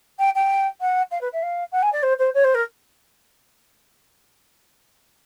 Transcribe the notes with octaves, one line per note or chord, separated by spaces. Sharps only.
G5
G5
F#5
F5
B4
E5
F5
F#5
G#5
D5
C5
C5
C#5
C5
A#4